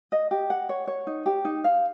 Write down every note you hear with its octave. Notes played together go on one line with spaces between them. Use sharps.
D#5
G4
F#5
C#5
C#5
D#4
G4
D#4
F5